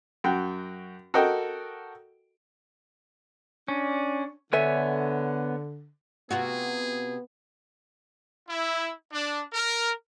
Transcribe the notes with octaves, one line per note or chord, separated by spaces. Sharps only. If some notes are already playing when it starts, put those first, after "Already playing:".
F#2 F#4 G5
F#4 A4 A#4 D#5 G5
C#4 D4
D3 B3 A4 C#5 E5 G#5
C3 B3 F4 F#4 G#4
E4
D4
A#4